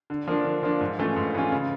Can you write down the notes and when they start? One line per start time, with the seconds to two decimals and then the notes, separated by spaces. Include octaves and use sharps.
0.10 D3
0.27 F3 A#3 D4
0.45 D3
0.63 F3 A#3 D4
0.81 G#2
0.99 E3 A3 C#4 F4
1.16 G#2
1.35 E3 A3 C#4 F4
1.52 C#3